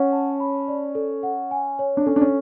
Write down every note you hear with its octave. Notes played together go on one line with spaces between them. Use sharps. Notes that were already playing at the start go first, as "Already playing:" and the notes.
Already playing: C#4 C#5 F#5
A5
B5
D5
A4
F#5
G#5
C#5
D4
C#4 A4
D4
C#4